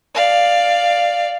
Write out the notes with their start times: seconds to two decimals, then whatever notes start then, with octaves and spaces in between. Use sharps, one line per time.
0.15 D5 F5